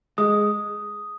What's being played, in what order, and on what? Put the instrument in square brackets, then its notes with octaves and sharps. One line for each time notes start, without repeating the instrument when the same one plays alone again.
[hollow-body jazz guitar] G#3 [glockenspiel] D#6